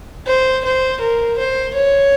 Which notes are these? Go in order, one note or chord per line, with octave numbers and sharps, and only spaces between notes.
C5
C5
A#4
C5
C#5